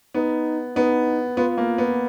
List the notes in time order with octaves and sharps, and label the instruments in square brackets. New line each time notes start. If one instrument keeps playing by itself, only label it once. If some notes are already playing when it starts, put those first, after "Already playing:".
[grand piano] B3 [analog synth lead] D#4
[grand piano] B3 [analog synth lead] D#4
[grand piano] B3 [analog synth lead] F4
[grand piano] A#3
B3